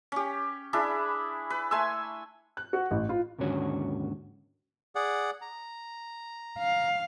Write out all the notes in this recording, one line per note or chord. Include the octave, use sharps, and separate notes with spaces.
C#4 G4
D4 E4 G#4 B5
B4
A3 G#5 C6 E6
F#6
F#4
A1
F4
D#2 G#2 D3 C#4 F#4 C#5
G#4 D5 F#5
A#5
F5